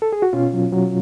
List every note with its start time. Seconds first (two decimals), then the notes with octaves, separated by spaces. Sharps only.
0.02 A4
0.13 G#4
0.22 F#4
0.33 B2 C#4 F4
0.53 F#3
0.72 F#3